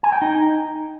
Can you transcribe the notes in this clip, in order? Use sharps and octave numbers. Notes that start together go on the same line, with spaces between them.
G#5
G5
D#4